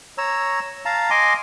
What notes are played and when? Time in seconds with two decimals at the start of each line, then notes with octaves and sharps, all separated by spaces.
0.18 C#5 A#5 E6
0.85 F5 A5 A#5
1.10 D#5 G#5 C6 D6